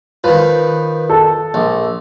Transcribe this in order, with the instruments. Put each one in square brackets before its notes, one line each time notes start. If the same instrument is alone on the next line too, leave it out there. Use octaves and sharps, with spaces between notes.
[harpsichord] D#3 F3 [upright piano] B4
[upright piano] A4
[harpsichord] A#1